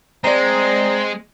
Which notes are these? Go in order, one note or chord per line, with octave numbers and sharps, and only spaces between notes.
G#3 C4 D5 A#5